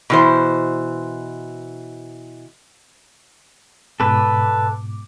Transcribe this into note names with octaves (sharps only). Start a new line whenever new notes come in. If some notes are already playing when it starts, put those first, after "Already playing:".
B2 E3 C5
G#2 B2 A4 B4 D6